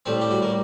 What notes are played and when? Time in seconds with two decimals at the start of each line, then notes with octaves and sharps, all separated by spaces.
0.06 A2 G3 C4
0.21 G4
0.30 F#4
0.42 A#3